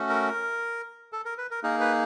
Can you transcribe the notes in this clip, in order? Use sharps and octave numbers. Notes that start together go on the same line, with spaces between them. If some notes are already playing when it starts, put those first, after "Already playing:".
Already playing: A3 C#4 F#4
A#4
A4
A#4
B4
A#4
A#3 D#4 G#4 A#4
B4